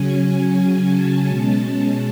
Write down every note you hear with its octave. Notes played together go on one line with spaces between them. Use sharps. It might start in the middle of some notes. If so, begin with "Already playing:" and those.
Already playing: C#3 F#3 C#4 G#5
G#5
A5
B2 G#3 C#4 A5